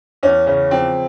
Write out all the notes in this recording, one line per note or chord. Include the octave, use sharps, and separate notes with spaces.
E2 C#4
C#3 C#4
F3 C4